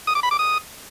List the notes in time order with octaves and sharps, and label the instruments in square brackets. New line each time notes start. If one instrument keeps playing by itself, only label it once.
[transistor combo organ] D#6
D6
B5
D6
D#6